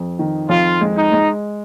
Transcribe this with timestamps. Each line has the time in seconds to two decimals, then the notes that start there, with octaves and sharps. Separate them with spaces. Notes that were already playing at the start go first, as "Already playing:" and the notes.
Already playing: F2
0.19 D#3
0.49 F2 F4
0.81 G#3
0.96 D#4
1.12 G#3